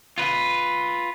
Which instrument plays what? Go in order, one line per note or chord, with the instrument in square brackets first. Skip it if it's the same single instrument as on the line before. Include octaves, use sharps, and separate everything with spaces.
[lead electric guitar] F4 B4